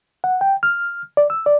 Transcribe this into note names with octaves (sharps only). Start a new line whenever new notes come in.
F#5
G5
F6
D5
E6
D5